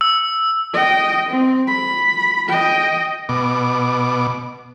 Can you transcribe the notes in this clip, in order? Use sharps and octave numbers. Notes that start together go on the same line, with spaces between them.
E6
D#5 G5
C4
B5
D#5 G5
B2 D6